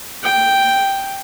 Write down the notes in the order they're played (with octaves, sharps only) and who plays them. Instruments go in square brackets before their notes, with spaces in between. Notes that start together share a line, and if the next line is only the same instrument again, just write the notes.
[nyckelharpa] G5